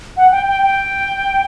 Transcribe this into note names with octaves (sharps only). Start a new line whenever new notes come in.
F#5
G5
G5
G5